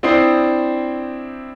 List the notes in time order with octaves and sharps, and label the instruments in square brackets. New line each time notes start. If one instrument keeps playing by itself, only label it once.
[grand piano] C4 D4 E4 C5 D#6 C7